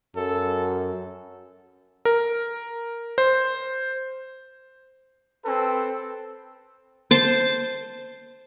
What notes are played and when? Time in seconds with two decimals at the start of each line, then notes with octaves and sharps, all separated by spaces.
0.16 F#2 A4
2.05 A#4
3.18 C5
5.45 C4 A4 B4
7.11 C5 A5